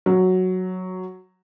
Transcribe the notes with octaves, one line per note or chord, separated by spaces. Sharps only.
F#3